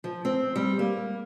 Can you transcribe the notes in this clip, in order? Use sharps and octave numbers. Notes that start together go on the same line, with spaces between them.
F3
C4
G3
A#3